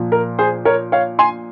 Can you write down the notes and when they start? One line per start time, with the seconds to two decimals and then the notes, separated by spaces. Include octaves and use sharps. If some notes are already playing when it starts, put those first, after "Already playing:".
Already playing: A#2 F3
0.12 A#4
0.39 G#4 C5
0.65 A#4 C#5
0.92 C#5 F5
1.19 G#5 C6